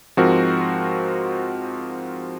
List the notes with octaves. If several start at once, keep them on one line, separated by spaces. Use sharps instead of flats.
G#2 F3 C4 F#4 A#4